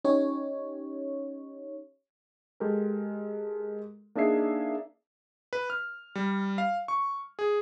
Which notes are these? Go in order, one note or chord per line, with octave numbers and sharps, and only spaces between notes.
C#4 D#4 G4 C#5
G#3 G4 A4 A#4
A#3 D4 D#4 G#4 E5 C7
B4
F6
G3
F5
C#6
G#4